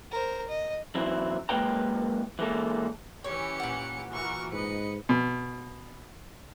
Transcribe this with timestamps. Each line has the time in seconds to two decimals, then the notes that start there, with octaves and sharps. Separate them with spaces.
0.11 A#4 C5
0.49 D#5
0.95 E3 F#3 C4 E4
1.49 F#2 G#3 A#3 B4 G5 A#5
2.39 E3 G#3 A#3 A4
3.24 E3 C#4 G4 C#5 C#7
3.60 A#2 F#5
4.12 E3 F#4 A#4 C#6
4.52 G#2 B4 D#5 C#7
5.09 B2